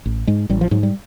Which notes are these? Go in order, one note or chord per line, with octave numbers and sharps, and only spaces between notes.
A1
G#2 G#3
A1 G3
F3
G#2 F#3
G3